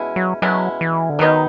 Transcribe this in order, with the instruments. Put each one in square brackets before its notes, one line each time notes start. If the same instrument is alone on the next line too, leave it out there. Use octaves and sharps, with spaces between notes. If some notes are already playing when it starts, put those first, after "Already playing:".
Already playing: [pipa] B2 G#3 C#4 E4
[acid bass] F#3
[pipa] B2 G#3 C#4 E4 [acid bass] F#3
[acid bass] E3
D3
[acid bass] D#3 [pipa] F#3 B3 D#4